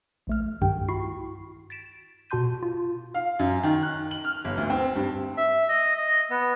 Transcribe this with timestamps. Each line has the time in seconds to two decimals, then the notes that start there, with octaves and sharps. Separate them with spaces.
0.27 A#1 A3 F6
0.61 C2 G2 D#3 G4 G5
0.88 E4 F#4 B5 C#6 C7
1.70 A6 B6 D7 E7
2.30 B2 F#4 A5 C6 G6 D#7
2.63 F4
3.14 F5
3.39 F#2
3.63 D#3
3.82 F#6
4.11 F#7
4.24 F6
4.45 G1
4.57 D2
4.70 C4
4.95 G2
5.37 E5
5.69 D#5
5.98 D#5
6.30 B3